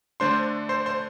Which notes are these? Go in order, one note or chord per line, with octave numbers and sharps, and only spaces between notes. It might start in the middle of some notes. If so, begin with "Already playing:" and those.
D3 A3 D4 C5 C6
C5 C6
C5 C6